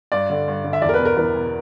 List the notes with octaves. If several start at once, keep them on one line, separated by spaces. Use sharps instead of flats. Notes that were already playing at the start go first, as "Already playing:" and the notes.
G2 D5
D3
G2
D3
E5
E2 D5
A#4
B4
B2
A#4
E2 B4
B2